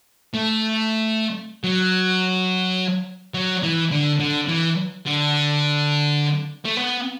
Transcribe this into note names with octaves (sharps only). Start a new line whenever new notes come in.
A3
F#3
F#3
E3
D3
D3
E3
D3
A3
B3